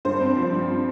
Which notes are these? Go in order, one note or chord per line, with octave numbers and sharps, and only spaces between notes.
G2 C5
C4
F3
G2